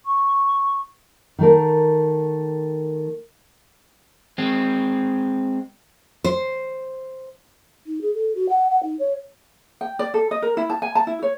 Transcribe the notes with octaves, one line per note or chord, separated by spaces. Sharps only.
C#6
D#3 A3 A#4
G#3 C4
C5
D#4
G#4
A4
F#4
F#5
F#5
D#4
C#5
G5
D5
A4
D#5
A#4
E4
A5
G#5
A5
E4
C#5